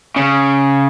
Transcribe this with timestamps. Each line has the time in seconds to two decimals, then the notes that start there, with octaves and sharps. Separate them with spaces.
0.16 C#3